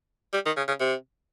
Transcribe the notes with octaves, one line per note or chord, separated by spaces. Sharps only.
G3
D#3
C#3
C#3
C3